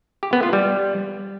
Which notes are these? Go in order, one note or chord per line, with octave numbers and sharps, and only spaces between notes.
G4
B3
F4
G3